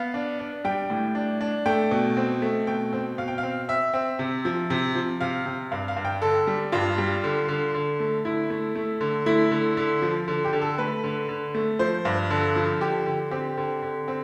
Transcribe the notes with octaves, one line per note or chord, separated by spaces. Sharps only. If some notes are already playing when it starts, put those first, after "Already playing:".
Already playing: B3 F5
D4
D4
G3 G5
A2
D4
D4
A3 G5
B2
C4
A3
B2 G5
C4
B2 F5
G5
F5
C4
C4 E5
C4
C3
F3
C3
F3
C3 F5
C3
G2 F5
F5
G2
G5
D3 A4
G3
G2 F4
G3
D3
D3
D3
A3
D3 E4
A3
A3
D3
A3 E4
D3
D3
F3
D3
G4
D3
A4
A3 B4
D3
D3
A3
F3 C5
G2
D3 A4
F3
D3 G4
D3
C4 G4
D3
D3
C4